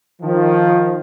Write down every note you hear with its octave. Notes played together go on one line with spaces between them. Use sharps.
D#3 F3